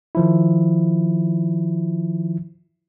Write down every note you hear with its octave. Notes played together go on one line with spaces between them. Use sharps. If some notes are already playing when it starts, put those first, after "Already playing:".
D#3 F3 E4